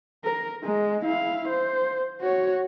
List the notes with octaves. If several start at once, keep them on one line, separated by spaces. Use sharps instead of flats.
A#4
G#3
E4 F5
C5
F#4 C#5